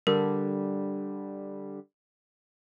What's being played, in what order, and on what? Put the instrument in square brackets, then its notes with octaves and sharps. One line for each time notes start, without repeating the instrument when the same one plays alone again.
[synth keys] D3 G3 [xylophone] A#4